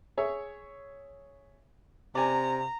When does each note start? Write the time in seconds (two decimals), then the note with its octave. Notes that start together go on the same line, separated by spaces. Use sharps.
0.17 G#4 C#5 E5
2.15 C3 D5 G#5 A#5